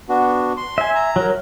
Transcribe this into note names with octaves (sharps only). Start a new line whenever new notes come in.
B3 D4 F#4
C6
E5 G#5
A#5
F#3 A#4